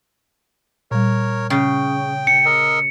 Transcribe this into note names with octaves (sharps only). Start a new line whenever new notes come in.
A#2 G3 A#4 C#5
C#3 G5
C#7
A#4 D#5 E6